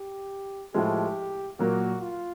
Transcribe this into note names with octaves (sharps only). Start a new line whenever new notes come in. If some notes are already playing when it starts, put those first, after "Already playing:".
Already playing: G4
A2 F3 G#3 G4
A#2 F#3 A#3 F#4
F4